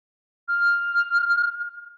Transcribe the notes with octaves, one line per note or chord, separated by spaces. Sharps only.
F6